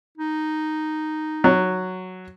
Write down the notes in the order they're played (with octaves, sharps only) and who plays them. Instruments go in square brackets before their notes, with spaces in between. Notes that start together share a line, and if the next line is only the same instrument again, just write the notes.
[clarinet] D#4
[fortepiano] F#3